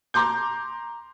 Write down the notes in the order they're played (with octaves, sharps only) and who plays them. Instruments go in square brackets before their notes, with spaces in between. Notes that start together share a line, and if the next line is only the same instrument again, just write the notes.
[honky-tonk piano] A#5 C6 D6 G6